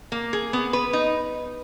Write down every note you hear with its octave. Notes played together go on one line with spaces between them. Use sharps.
A#3
G#4
B3
B4
D#4